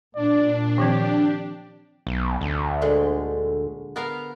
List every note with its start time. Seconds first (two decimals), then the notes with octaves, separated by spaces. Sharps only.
0.16 A#2 D4 D5
0.78 D#3 F3 C4 G4
2.07 B1
2.41 D2
2.81 A#2 D3 G#3
3.96 B3 A#4 F5